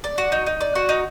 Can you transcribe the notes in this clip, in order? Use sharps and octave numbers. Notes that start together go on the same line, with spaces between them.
D5
F#4
D#4
D#4
D5
F#4
D#4